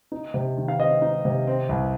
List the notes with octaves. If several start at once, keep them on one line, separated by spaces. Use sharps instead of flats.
D#4
C3
D#3
F5
C4 D#5
D#4
C3
C4
C2